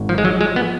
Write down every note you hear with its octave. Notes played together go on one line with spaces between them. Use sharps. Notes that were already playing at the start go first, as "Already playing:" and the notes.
Already playing: G#1
G#2 F3
G#3
F3 F#3
F3 G#3
B3